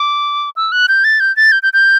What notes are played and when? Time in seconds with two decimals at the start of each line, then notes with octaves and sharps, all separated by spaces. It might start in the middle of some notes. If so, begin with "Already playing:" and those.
Already playing: D6
0.56 E6
0.72 F#6
0.88 G6
1.04 A6
1.20 G6
1.36 A6
1.52 G6
1.63 G6
1.73 G6